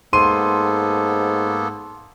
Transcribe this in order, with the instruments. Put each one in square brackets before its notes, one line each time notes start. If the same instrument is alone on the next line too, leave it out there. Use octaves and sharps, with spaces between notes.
[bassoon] G#2 [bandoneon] A#3 B3 A4 [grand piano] C6 D#7